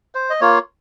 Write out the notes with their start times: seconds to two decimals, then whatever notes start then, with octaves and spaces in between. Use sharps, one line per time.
0.15 C5
0.30 D#5
0.41 A#3 F4 C#5